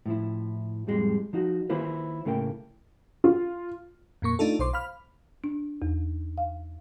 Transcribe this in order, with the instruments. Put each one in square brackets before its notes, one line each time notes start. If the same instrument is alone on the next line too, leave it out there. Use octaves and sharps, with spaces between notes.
[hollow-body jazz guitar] A2 F3 E4
F2 A2 G3 G#3
F3 D#4 F#4
D#3 A#3 E4 F4 B4 C5
A2 C#3 A3 A#3 G5
[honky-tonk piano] F4
[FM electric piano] F2 A#2 A#3 C#6
A3 D4 D#4 F4 A4
B1 C5 C6 D6
F5 B5 F6
[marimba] D4
E2
F5